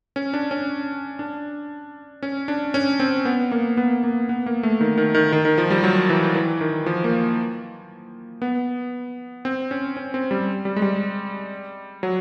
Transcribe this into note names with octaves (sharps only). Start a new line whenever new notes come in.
C#4
D4
C#4
D4
C#4
D4
C#4
C4
B3
A#3
B3
A#3
B3
A#3
A3
D#3
D#3
D#3
D#3
D#3
F3
G3
F#3
E3
E3
D#3
F3
A#3
B3
C4
C#4
C#4
C4
G3
G3
G#3
G3
F#3